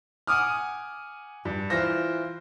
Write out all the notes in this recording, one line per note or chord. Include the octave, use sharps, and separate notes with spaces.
F#5 G#5 D6 D#6 F6
G2
E3 F4 C5 A#6